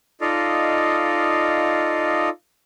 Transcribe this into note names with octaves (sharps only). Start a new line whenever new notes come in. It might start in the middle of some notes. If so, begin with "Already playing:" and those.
D#4 F4 A4 D5 D#5 F5